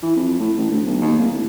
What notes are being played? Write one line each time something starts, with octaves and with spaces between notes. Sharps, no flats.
E3
F2
A2
A1
D2
B1
D#2
D1
A2